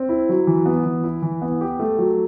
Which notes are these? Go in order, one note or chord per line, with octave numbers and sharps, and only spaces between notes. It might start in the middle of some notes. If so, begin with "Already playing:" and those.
Already playing: C4
E4
F#3
E3
B3
E3
E4
E3
B3
G4
A3
F#3